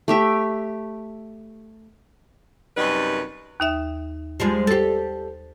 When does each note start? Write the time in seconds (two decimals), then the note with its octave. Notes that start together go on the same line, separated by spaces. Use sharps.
0.08 A3 G4 E5
2.77 F#2 C3 G3 D#4 B4
3.60 D#2 D#4 E5
4.40 F3 G3 G#3
4.67 G4 A4 C5 A6